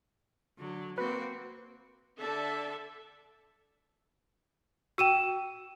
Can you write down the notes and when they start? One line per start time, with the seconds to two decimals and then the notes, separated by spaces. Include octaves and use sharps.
0.59 D3 F#3
0.98 A#3 C4 F#4 B4
2.19 D3 A4 D5 E5 A5
4.98 F#4 G5 E6 D#7 E7